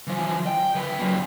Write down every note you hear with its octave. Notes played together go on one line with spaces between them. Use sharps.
E3 F3
G5
F3 B4
F#2 A#2